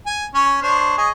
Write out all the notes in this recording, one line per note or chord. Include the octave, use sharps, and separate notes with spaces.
G#5
C#4 C#5
D4 C5 C#5
G#4 C#5 D#5